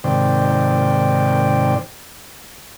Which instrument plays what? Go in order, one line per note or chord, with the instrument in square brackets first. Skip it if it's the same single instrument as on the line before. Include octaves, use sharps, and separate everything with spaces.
[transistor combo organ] G#2 C3 D#3 C5 D5 G5